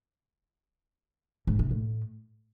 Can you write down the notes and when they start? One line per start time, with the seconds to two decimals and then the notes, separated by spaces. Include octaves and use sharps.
1.47 G#2
1.59 C3
1.71 A2